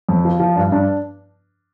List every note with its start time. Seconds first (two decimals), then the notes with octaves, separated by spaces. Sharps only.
0.09 F2
0.25 F3
0.40 F3
0.56 G2 D4
0.72 G2 D4